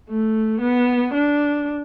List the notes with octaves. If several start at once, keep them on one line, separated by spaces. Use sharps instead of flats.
A3
B3
D4